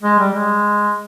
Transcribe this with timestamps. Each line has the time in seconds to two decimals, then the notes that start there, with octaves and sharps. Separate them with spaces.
0.02 G#3
0.19 G3
0.34 G#3